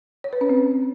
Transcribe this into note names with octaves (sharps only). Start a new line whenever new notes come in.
C#5
B4
C#4
C4